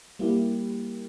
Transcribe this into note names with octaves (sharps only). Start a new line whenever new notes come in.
G3 A#3 E4 G4